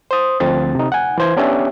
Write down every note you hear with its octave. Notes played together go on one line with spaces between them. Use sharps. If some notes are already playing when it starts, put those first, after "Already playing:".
C5 D#6
D2 F3 C4 A6
C3 D#4
F#5 G#5
E3 C5 G#6
B3 C#4 D4 G4 C#5 E5